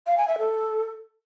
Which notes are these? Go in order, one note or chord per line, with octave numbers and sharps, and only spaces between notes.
F5
G#5
E5
A4